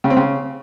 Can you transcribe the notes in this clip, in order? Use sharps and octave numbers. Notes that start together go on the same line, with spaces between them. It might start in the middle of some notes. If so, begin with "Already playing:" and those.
C#3
C4
C#3